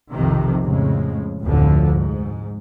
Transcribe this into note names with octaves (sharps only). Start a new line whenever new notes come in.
B1 F2 C3 D#3
F2 A2 C#3 G#3
F1 D2 A2 D3 F3
G#2